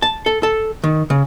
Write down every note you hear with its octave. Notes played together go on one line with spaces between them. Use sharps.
A5
A4
A4
D#3
C#3